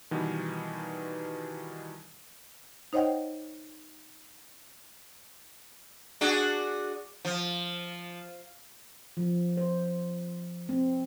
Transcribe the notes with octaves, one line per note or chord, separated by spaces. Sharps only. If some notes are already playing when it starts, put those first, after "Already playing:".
B2 D#3 E3 G3 B3
D#4 C5 C#5 D#5 F#5 G5
D4 F#4 G#4
F3
F3
C5
C4